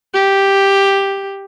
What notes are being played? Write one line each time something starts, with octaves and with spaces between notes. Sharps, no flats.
G4